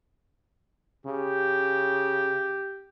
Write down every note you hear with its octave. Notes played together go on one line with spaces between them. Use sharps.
C#3 G4